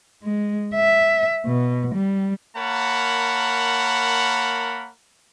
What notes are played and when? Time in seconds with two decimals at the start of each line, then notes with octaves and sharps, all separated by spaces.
0.23 G#3
0.75 E5
1.46 B2
1.95 G3
2.55 A#3 A#4 C#5 F#5 A5 B5